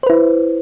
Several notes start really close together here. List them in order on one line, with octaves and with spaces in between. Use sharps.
C5 B4 E4